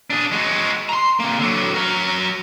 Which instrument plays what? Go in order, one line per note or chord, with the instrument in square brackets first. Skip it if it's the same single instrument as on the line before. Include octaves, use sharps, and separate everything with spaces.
[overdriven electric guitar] D4 G#4
G#3 F#4
A#5 C6
C3 A#3
D3 F#3
F#3 A#4